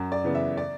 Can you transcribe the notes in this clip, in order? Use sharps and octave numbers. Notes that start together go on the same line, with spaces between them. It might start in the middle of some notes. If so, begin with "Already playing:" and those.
Already playing: F#2
D5
C#3 E3 B3
E5
D5